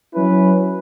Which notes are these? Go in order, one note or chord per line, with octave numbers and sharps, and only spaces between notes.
F#3 C#4 E4 B4